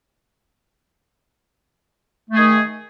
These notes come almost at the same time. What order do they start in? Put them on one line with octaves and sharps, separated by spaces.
A3 G#4 D#3